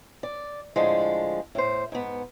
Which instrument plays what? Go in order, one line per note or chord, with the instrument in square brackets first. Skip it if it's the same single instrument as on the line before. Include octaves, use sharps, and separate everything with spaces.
[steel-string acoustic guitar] D5
A2 D3 F3 G#3
A2 C5
G#2 B3